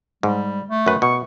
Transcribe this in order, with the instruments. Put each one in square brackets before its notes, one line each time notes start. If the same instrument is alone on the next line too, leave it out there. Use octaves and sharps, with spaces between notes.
[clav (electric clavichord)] G#2 [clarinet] G3
[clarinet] A3
[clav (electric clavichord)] F#2 B4
[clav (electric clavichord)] B2 [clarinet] C#6